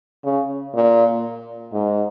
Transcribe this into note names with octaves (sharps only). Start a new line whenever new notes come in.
C#3
A#2
G#2